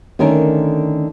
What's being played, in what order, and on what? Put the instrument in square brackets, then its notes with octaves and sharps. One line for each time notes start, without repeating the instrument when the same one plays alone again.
[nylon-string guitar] D3 D#3 A3 C#4 A#4